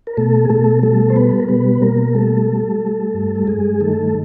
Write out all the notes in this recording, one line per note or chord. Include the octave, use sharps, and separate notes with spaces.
A#4
B2 A3 A4
G#4
B2 A3 A4
G3 A3 A4
C5
G3 B3 B4
A4
A#4
B2 B3 B4
B2 A#3 A#4
G3 A3 A4
G3
G3
G2
A4
G2 G#3 G#4
D#3 A3 A4